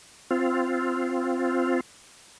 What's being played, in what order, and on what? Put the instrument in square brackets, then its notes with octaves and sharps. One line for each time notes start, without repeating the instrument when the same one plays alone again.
[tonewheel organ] C4 F4